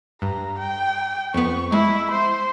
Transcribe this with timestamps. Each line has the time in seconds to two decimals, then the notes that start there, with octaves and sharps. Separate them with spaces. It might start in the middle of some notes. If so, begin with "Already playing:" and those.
0.22 G2 A#5
0.59 G5
1.34 F2 B3 C#6
1.72 G#3 E4
2.11 C5